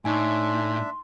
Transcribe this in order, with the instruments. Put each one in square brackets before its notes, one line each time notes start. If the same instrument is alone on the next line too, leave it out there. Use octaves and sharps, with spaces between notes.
[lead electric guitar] A2 [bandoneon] D4 E5 [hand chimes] D#4 G#5 [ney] C6